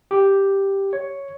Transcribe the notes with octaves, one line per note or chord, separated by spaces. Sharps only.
G4
C#5